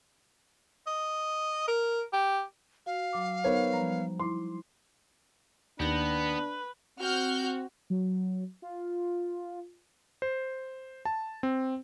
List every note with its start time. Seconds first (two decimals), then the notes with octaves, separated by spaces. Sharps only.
0.87 D#5
1.68 A#4
2.13 G4
2.86 F#4 F5
3.13 F#3 D6
3.44 B3 D#4 A#4 C5 C#5
3.73 F3 G3 A#5
4.20 E4 C6 D6
5.80 D#2 B3 D4 B4 G5 A#6
6.99 C4 F#4 F6 G6
7.90 F#3
8.62 F4
10.22 C5
11.05 A5
11.43 C4